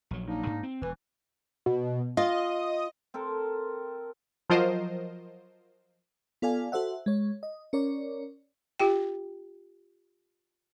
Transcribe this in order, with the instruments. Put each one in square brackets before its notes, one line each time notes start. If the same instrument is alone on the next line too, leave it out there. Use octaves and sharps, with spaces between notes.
[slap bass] A#1 F#3
[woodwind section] A#3 D4 D#4
[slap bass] G#2
C4
[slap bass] E1 E2 [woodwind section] E3
[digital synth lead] B2
[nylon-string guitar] F4 [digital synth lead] D#5
[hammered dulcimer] C4 A4 A#4
[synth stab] F3 F#3 F4 A#4 C5 D#5
[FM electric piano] B3 F4 A4 D5 F5 G#5
F#4 A4 C5 E5 F#5
G#3 C#5
D#5
C#4 A#4 C#5 D5
[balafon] F4 G4 G5